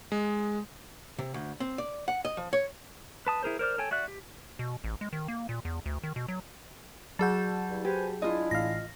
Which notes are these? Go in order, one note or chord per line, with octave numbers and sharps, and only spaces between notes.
G#3
C3
D2
C4
D5
F#5
D#5
F3
C#5
B4 A5 D#6
E4 G#4 A#4 C5
A#4 C5 D5 F6
A4 C#5 G5 G#5
F#4 D5 E5 F#6
G4
B2
A1
G#3
D#3
A#3
A#2
E2
D2
D#3
B2
F#3
F#3 F#4 G#4 A5 G6
G2 E4
G4 B4 C5 G#5
G#3 D4 E4 F4 D#5
A1 F5 A#6